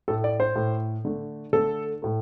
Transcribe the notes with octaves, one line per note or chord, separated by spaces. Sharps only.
A2 A3 A4
D5
C5
A2 A3
D3 A3
D3 A3 A4
A2 A3